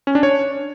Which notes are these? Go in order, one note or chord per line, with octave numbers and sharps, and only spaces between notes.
C#4
D4
C#5